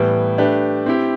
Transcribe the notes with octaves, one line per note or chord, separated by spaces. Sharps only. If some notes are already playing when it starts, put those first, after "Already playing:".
Already playing: A2 E3 G3 B3
A3 D4 G4 B4
C4 E4 G4